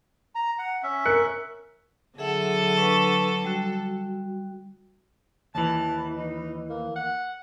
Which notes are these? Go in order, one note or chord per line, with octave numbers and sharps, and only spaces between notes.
A#5
F#5
C#4 E5
A#4 F#6 C#7
D3 F#3 G#4 A4 E5 F#5
D4 B4 C#6
G3 F#4
D#2 E3 A5
D#4
A#3
F#5